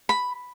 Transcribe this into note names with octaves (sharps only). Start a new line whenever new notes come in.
B5